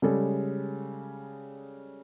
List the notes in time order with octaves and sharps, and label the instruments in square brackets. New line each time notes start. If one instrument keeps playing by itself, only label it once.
[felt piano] C#3 G3 G#3 A4